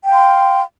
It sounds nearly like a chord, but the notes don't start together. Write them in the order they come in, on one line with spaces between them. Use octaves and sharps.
G5 F5 C6